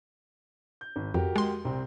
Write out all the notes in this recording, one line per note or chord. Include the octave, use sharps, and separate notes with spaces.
G6
G#1
F2 F#4 G4 A#4
G#3 C6
C2 C4